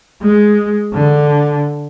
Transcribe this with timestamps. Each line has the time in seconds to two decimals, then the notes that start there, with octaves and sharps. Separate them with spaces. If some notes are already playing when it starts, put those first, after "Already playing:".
0.22 G#3
0.94 D3